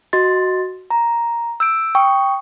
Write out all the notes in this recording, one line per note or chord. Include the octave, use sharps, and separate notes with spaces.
F#4 D#5 C6 A6
A#5
E6 G6 D7
G5 C#6 D#6